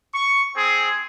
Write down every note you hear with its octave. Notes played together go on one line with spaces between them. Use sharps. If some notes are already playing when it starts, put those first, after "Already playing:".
C#6
C4 G#4